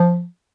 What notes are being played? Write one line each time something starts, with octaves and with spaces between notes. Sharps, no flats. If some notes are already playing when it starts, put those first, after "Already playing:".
Already playing: F3